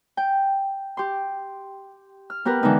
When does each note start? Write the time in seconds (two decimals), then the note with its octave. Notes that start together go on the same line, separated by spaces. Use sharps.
0.17 G5
0.97 G4 C6
2.30 F6
2.45 B3 G4 A#4 B4
2.63 D3 E3 G#3 B3 D#4